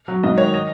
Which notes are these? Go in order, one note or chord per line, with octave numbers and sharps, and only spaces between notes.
F#3
G#2 D#5
D#3 C#5
D#5